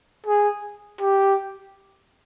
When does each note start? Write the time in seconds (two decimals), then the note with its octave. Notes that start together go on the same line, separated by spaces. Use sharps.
0.26 G#4
1.00 G4